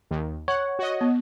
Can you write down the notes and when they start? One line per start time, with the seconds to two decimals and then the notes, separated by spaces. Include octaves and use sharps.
0.11 D#2
0.48 C#5 F#5
0.79 F#4 D#5
1.01 B3